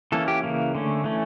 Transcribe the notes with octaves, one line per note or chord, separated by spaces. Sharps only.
E3 A#3 C#4 A4
G4
C#3 E3 A#3
D3 A3 C#4
E3 A3 C#4